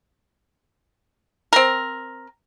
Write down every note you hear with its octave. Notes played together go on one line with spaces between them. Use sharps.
C4 A#4